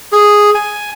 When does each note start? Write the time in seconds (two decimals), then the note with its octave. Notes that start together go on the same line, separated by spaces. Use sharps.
0.12 G#4
0.55 G#5